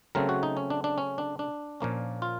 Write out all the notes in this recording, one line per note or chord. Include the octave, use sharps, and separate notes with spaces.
C#3 F#3 A3 C4 A#4
F#4
D#4
C#4
D4
D4
C#4
D4
D4
A#2 F3 A#3 C#4
F4